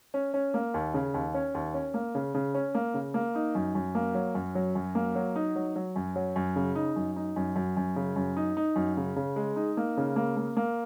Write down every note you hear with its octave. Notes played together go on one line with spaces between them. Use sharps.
C#4
C#4
A#3
D#2
C#3
D#2
C#4
D#2
C#4
A#3
C#3
C#3
C#4
A#3
C#3
A#3
D#4
F#2
F#2
A#3
F#3
F#2
F#3
F#2
A#3
F#3
D#4
F#3
F#3
F#2
F#3
F#2
C#3
D#4
F#2
D#4
F#2
F#2
F#2
C#3
F#2
D#4
D#4
F#2
C#3
C#3
G#3
D#4
A#3
C#3
A#3
A#3
A#3